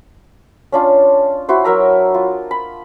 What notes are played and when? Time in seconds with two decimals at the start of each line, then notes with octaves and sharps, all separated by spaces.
0.72 C#4 D4 F4
1.49 E4 F#4 C5
1.64 F#3 A#4 E5 A#5
2.14 F4
2.51 B5